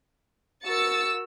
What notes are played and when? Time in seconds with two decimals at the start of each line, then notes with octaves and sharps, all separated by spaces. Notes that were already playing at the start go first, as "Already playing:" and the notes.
0.64 F#4 A#4 E6 A6 C#7